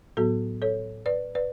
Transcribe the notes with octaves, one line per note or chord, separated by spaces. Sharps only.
A2 F#3 B3 F#4 A4
A4 C#5
B4 D5
B4 D5